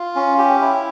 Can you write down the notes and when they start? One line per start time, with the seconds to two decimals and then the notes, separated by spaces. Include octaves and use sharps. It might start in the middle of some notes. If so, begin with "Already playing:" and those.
Already playing: F4
0.16 C#4
0.38 G4
0.61 E4